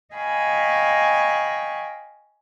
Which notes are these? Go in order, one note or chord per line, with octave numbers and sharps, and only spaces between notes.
D#5 F5 G5 G#5 B5 C#6